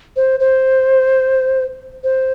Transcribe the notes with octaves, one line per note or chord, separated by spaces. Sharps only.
C5
C5
C5